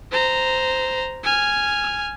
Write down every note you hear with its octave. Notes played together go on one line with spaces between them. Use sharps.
C5 A#5
G#5 F6